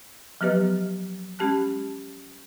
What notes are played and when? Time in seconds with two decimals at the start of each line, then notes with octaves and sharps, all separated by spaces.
0.41 F3 F#3 B3 G4 B4 D#5
1.39 G#3 C#4 G4 A5 F#6